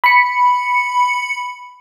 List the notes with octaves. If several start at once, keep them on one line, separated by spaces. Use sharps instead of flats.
B5 C#7